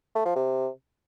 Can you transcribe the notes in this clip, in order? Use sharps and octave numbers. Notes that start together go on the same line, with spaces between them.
A3
F3
C3